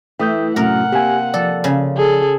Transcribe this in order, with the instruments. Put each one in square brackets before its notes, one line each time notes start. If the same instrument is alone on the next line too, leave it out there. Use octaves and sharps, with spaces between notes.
[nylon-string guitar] E3 A3 [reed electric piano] G5 D#6 G6
[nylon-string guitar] F#2 [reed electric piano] A2 C3 A3 [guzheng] A#4 [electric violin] F#5
[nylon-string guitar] C3 A#3 [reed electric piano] G4 G#5
[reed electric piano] F3 D5 [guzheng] A4
[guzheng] C#3
[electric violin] G#4 A4